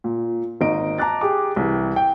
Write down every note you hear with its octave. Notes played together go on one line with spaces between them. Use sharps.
A#2
G#1 A#3 D#4 D#5 D7
A5 A#5 D6 F#6 A6
G4 G#4 D6
C2 E3
G5